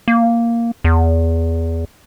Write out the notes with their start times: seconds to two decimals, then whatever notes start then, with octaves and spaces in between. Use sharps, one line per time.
0.08 A#3
0.84 E2